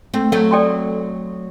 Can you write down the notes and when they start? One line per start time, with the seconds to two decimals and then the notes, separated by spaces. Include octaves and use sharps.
0.14 A3 C4
0.32 F#3 A3
0.51 A4 D5 G5 C6